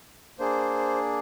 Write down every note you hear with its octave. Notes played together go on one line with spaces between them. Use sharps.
A#3 D4 G#4 C5